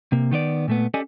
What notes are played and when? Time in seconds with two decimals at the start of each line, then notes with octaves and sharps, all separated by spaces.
0.12 C3 A#3
0.31 D#3 B3 C5 D5
0.68 A#2 A3 B3
0.94 C#4 G4 A4 D5 D#5 G#5